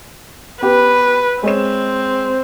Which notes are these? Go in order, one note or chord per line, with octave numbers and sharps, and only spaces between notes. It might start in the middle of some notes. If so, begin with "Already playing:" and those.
B3 G4 B4
G#3 C4 C#5 E7